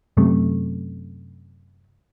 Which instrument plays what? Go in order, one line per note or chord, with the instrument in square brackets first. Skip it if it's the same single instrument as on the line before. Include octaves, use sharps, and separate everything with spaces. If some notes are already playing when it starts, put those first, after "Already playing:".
[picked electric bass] F#2 C3 A3